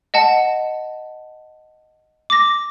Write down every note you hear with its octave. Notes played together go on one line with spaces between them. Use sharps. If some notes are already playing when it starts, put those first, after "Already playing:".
D#5 F#5 A5
D6 A#6